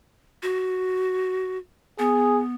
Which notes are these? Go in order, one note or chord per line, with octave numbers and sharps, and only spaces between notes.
F#4
B3 G#4